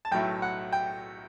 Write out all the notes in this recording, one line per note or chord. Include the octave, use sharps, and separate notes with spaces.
A5
B1 A2 F#3 A3 E4 G5
F#5
G5